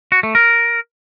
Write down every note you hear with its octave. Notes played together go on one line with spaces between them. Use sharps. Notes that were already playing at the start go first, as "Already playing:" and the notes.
F#4
A3
A#4